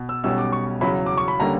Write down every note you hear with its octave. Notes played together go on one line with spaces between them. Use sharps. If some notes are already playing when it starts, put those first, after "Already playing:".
Already playing: B2
E6
B1 B2 G3 C#4 E6
D6
C#6
E2 C#3 F#3 C#4 B5
D6
C#6
B5
D3 G3 A#3 C#4 A#5